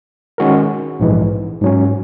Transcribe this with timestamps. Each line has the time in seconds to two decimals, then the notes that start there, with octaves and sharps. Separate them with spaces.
0.38 D#3 G#3 C#4 F#4 A#4
1.00 A#1 G#2 E3 G#3
1.61 G#2 F#3 C#4